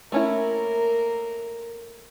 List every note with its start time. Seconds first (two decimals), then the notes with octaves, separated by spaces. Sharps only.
0.12 A3 A#3 C#4 E4 A#4